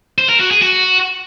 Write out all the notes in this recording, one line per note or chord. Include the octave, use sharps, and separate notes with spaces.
C5
A#4
F#4
G#4
F#4